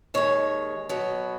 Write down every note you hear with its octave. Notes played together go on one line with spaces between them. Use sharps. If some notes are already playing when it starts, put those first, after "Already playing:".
D#2 D#3 G#3 C#5
B2 F#3 B3